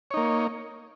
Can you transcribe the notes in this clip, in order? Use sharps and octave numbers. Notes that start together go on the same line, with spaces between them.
A#3 D#4 C#5